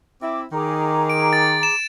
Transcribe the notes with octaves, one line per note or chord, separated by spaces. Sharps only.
C4 E4 D6
D#3 G#4 A#5 D6
D7
A6
E7